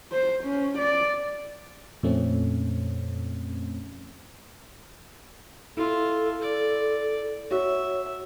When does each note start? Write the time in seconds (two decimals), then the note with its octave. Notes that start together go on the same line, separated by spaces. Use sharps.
0.12 C5
0.43 C#4
0.78 D5
2.03 F2 A#2 F3 A3 C4 C#4
5.77 E4 F4 A4 E5
6.42 D5
7.51 F#4 C#5 E5